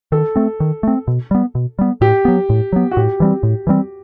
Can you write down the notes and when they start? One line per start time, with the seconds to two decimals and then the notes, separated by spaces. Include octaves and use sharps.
0.12 D#3 A4
0.36 A3 C4
0.60 D#3
0.83 A3 C4
1.08 B2
1.31 G3 B3
1.55 B2
1.79 G3 B3
2.01 A2 G4
2.25 F#3 B3
2.50 A2
2.73 F#3 B3
2.91 F#4
2.97 A2 G4
3.20 E3 G3 C4
3.43 A2
3.67 E3 G3 C4